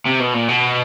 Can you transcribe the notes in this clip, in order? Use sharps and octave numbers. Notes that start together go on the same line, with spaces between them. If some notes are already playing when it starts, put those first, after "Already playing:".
C3
B2
A#2
B2